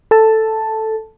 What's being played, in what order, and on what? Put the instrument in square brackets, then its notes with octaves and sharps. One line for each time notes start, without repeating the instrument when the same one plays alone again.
[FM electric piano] A4 A5